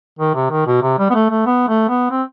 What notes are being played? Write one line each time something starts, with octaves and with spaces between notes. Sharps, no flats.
D#3
C3
D#3
B2
C3
G3
B3
A3
A3
B3
A3
B3
C4